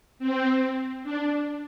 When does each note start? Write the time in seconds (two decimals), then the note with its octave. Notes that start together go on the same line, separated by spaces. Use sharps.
0.19 C4
1.04 D4